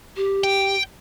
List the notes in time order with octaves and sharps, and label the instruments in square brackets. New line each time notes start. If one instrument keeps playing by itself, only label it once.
[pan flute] G4
[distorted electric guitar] G5